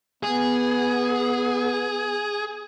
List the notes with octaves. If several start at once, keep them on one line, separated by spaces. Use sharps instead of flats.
B3 G#4